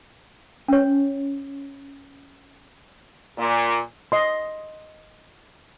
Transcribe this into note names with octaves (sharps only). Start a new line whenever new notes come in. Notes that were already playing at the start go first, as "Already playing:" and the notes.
C#4 C#5
A#2
D#5 C6